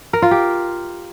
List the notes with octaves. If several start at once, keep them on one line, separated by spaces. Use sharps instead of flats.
A#4
F4
G4